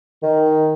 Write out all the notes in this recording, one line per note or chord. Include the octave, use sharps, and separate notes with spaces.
D#3